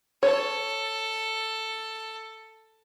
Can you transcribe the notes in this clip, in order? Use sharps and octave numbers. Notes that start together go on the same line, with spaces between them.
A4 C#5